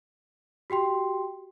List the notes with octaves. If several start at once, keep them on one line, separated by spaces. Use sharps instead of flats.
F#4 G4 G5 C6